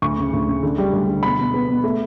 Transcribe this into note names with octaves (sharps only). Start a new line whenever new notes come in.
D2 C#6
C#3
D2
C#3
D3
G3
D2
D3
B2 B5
B2
B3
B2
A3